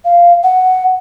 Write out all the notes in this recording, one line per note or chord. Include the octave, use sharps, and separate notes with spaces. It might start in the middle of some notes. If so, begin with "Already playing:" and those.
F5
F#5